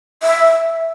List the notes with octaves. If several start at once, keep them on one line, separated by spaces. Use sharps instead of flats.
E5